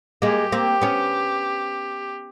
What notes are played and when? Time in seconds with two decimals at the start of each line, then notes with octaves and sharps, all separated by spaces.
0.22 G#3 A#3 G4
0.52 A#3 C4
0.81 B3 C#4